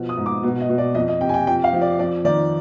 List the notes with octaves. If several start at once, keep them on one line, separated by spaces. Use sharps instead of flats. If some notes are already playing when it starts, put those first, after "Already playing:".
Already playing: B2 F3
D#6
G#2
D6
B2
D#5
B2
D5
F2 D#5
D#5
C3 G5
G#5
G5
F2 G5
F5
F3
D5
F2 D5
D#3 D5